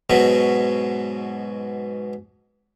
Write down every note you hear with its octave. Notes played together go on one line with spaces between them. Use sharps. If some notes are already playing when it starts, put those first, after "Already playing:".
G#2 B2 F#3